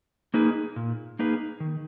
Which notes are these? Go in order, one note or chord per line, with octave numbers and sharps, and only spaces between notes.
A#3 D#4 G#4 B4
A#2
A#3 D#4 G#4 B4
D#3